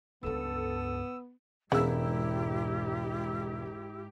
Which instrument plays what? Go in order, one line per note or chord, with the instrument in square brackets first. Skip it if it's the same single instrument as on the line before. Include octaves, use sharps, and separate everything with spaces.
[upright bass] C#2 G2 [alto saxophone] B3 [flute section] A4 [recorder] E6
[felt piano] E1 E6 [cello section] G#2 G4 [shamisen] C#3 B3 [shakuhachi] E4